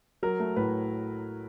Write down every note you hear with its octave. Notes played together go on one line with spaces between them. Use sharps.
F#3 A#4
A3
A2 B4